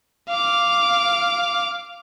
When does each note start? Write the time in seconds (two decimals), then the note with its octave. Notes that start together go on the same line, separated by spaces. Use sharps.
0.29 F5 D6